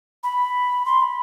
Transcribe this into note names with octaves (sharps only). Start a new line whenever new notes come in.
B5
C6
B5